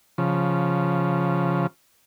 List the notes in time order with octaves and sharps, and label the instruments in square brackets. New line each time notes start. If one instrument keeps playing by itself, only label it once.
[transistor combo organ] C#3 F3